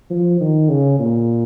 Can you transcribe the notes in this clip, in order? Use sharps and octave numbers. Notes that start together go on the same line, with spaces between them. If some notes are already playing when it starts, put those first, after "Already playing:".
F3
D#3
C#3
A#2